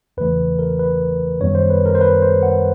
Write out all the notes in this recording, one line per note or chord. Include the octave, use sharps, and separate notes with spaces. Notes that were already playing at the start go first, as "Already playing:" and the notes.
E2 C#3 E3 A3 B4
A#4
B4
F#2 D#3 G3 B3 C#5
C5
B4
A#4
C5
B4
C5
F#5